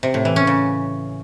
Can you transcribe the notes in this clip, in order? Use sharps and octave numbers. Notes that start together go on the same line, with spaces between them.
C3
A2
E3
C#4
C#3